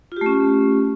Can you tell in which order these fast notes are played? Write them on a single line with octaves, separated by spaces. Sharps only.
F4 G4 A3 C#4